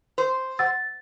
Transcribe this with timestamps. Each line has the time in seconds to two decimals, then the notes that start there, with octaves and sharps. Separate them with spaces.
0.18 C5
0.59 F#5 E6 A6